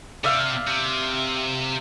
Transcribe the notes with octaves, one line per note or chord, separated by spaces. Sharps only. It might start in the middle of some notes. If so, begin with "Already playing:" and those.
C3 D5 E5 F5
C3